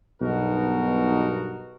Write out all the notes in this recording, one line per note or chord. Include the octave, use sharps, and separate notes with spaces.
B1 G2 B2 D#4 F#4 A#4